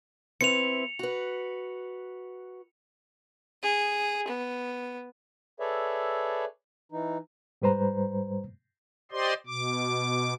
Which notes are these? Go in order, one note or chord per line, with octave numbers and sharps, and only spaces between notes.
C4 E4 B4 C#7 F7
F#4 B4
G#4
B3
G#4 A4 B4 C#5 D5 E5
E3 D#4
G#2 G3 B4 C5 A#5
G4 C5 D5 D#5 C6
B2 D6